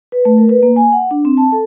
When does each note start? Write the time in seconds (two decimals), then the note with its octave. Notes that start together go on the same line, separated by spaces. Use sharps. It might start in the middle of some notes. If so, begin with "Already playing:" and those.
0.12 B4
0.25 A3
0.38 A#4
0.49 B4
0.63 A#3
0.76 G#5
0.92 F#5
1.11 D4
1.25 C4
1.37 A5
1.52 A4